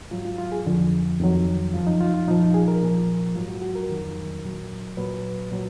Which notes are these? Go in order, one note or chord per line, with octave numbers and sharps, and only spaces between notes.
G#2 F#3 F4
F4
F4
G#4
F2 D3 F3
F2 D#3 F#3
F#2 F3 F4
D#4
F4
F4
A#2 F3 D#4
F4
G#4
A#4
A#2 F3
G#2 F#3 F4
F#4
F#4
A#4
F2 D#3 F#3
A#2 F#3
A#2 F#3 B4
A#2 F#3